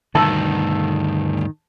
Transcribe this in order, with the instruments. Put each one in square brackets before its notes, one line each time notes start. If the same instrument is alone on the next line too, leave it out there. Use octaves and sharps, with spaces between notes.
[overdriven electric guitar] D2 G2 [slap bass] D#3 [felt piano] A5 E6